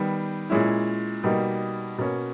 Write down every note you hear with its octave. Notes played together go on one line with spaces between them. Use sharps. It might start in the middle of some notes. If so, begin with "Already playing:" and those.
Already playing: D#3 G3 B3
A#2 G#3 C#4 E4
B2 G3 A#3 D#4
B2 A#3 C#4